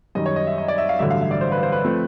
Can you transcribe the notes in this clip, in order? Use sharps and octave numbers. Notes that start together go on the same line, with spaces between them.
F#2 D#3 G3 D#5
C#5
D#5
E5
D#5
D5
E5
F5
A1 G2 D3 F#3 E5
F5
E5
D5
C5
B4
C5
B4
F3 A3 C4